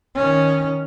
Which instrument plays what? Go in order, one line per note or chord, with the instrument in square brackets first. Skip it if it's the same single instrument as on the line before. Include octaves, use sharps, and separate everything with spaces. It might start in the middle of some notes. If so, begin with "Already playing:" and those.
[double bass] D#3 C#4